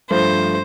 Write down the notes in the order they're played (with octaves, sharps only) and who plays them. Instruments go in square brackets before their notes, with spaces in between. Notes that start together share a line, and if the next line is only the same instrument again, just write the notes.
[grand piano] G2 F3 A3 [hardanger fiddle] C5